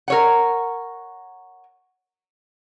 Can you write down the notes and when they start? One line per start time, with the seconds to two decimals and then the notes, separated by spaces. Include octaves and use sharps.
0.08 A#4 C#5 F#5